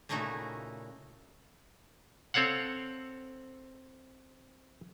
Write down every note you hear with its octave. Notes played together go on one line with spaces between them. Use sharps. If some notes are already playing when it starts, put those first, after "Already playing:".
A#2 C#3 A3 D#4 E4 F#4
C4 A4 C#5 F5 F#5